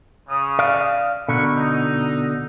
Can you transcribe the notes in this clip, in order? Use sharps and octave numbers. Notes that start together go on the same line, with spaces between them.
C#3 D#6
D5 F5
B2 D3 A#4 B5 C#6
D#4